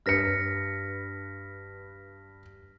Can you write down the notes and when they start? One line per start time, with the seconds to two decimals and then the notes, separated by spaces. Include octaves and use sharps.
0.06 G2 B4 F6 A#6 B6 C#7